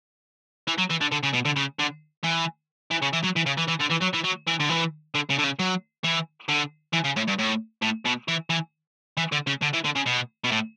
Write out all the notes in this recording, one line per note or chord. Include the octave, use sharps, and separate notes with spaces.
E3
F#3
E3
D3
D3
C#3
B2
D3
C#3
D3
E3
E3
C#3
E3
F#3
E3
C#3
E3
E3
D3
E3
F#3
E3
F#3
E3
D3
E3
D3
C#3
D3
C#3
F#3
E3
D3
E3
C#3
A2
G2
A2
A2
B2
E3
E3
E3
D3
C#3
D3
E3
D3
C#3
B2
B2
A2